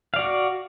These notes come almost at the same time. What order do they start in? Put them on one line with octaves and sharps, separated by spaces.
F5 D5 F#4